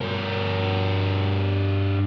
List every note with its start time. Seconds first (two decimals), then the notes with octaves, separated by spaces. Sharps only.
0.01 G2 A#4